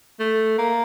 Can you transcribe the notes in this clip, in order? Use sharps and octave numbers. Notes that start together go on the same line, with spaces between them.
A3
A#3